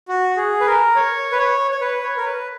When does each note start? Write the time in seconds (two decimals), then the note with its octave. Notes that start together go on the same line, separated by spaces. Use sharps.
0.08 F#4
0.36 G#4
0.61 B4
0.66 A#4
0.96 C#5
1.32 B4
1.38 C#5
1.71 C#5
1.81 B4
2.03 C#5
2.17 A#4
2.25 B4